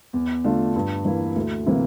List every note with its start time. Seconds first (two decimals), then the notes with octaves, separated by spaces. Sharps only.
0.13 E2
0.44 D3 A3 D4 F4
0.75 G2
1.05 E3 A#3 E4
1.36 D2
1.66 C3 E3 A#3